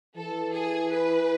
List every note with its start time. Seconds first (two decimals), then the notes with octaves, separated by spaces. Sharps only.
0.17 E3 A4
0.55 G#4
0.93 B4